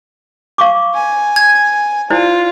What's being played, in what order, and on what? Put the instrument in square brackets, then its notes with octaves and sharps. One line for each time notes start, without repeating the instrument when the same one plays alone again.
[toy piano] F5 C#6 D6
[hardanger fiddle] G#5
[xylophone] G#6
[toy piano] E4 C5 D5 [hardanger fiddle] F4